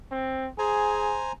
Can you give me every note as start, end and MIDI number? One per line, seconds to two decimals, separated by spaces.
0.11 0.48 60
0.58 1.18 68
0.58 1.32 72
0.58 1.32 80
0.58 1.32 82